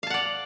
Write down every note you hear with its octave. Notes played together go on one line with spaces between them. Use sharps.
D5 F5 F#5 A5